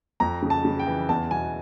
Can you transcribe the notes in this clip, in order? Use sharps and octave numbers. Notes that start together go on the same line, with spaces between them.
F2 A#5
C#3
A5
C#3
G5
E3
E2 A5
B2 G#5